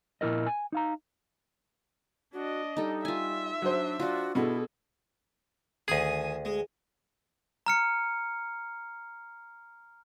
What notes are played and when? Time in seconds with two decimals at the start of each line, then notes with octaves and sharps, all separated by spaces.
0.21 A#2 E4 A#4 D#5
0.47 G#5
0.72 D#4 F5 A#5
2.33 D4 F#4 D#5
2.77 G3 D#4 A4
3.05 F4 E5 G#5
3.62 F#3 D4 C5
4.00 D4 F4 F#4
4.35 B2 E4 G#4 A4
5.88 D2 D#3 G#4 G#5 D#6
6.45 G#3
7.66 A#5 F6 C#7